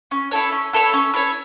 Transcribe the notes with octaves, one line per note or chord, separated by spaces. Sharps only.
C#4
E4 A4 C#5
C#4
E4 A4 C#5
C#4
E4 A4 C#5